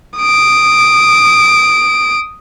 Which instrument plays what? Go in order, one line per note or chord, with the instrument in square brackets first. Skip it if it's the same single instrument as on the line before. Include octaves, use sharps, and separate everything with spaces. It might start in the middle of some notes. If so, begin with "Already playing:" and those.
[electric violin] D#6 D7